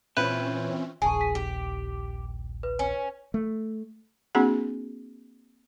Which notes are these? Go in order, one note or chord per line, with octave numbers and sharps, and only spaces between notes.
A#2 E3 C4 C#4 F4 B4 E5 G6
D#1 A#1 G#4 G#5 A5 C#6
B6
G4
B4
C#4
A3
A#3 C4 D4 F#4 G#4 F#5